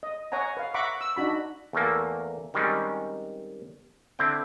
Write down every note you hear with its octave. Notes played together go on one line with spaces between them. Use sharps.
D#5
C#5 F#5 G#5 A#5
B4 F5
E5 F#5 A#5 B5 C#6 D6
E6
D4 D#4 F#4 B5
E2 A3 A#3
D#3 G3 G#3 C4 C#4
D3 C4 E4 G5